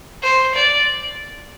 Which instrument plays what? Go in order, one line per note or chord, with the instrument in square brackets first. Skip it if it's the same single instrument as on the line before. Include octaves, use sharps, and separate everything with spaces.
[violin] C5
D5